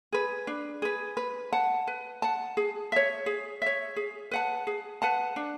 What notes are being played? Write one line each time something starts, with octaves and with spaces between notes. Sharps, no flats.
G#4 B4
D4
G#4 B4
B4
F#5 A5
B4
F#5 A5
G#4
C#5 E5
G#4
C#5 E5
G#4
B4 F#5 A5
G#4
B4 F#5 A5
D4